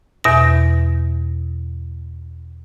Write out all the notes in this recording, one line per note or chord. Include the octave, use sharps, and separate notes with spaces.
E2 B2 E5 A#6